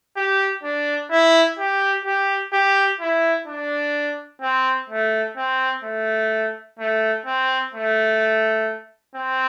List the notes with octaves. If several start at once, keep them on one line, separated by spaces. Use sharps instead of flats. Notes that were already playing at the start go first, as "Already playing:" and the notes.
G4
D4
E4
G4
G4
G4
E4
D4
C4
A3
C4
A3
A3
C4
A3
C4